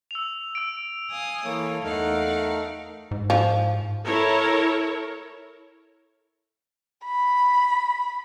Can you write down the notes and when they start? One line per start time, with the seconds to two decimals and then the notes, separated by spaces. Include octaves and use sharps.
0.11 E6 F7
0.55 E6 D7
1.08 F5 G#5 D#6
1.45 E3 A#3 A4 C#5
1.83 E2 A3 D#4 A#4 F5 F#5
3.11 G#2
3.30 F3
4.06 E4 A4 A#4 C#5
7.05 B5